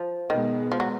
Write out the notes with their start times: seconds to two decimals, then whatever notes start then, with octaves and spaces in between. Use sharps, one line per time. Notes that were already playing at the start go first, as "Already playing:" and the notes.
Already playing: F3
0.29 B2 D#3 G#3 B3
0.72 F3
0.80 F#3